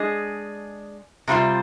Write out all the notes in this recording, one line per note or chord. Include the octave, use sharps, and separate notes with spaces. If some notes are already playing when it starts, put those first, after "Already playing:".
Already playing: G#3 D4 G#4 D#5
C3 G3 C4 F4 C5